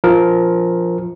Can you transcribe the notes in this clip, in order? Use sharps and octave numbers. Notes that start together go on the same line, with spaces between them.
F3 A#4